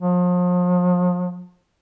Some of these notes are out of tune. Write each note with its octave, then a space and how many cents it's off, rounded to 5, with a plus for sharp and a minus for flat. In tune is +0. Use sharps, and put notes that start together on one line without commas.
F3 +40